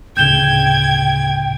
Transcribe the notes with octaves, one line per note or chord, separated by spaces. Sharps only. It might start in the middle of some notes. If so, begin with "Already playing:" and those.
D2 A2 C#3 G5 G6 G#6 E7 G7